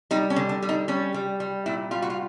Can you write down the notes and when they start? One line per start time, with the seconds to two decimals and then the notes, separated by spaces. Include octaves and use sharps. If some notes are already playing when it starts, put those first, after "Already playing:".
0.11 G3 D#4
0.30 C#4
0.36 D3
0.49 D4
0.62 G3
0.69 D#4
0.88 G3 C#4
1.14 G3
1.40 G3
1.66 A#2 E4
1.91 G3 F4
2.02 F#4
2.10 F4